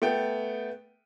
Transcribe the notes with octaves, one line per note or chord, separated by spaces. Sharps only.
A3 B3 G5